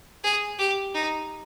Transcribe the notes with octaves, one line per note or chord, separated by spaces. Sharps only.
G#4
G4
D#4